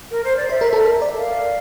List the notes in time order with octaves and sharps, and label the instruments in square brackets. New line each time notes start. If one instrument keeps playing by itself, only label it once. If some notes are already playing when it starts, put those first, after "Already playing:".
[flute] A#4
C5
D5
[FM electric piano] C5 [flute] E5
[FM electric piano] A#4
A4
A#4
D5
[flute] F5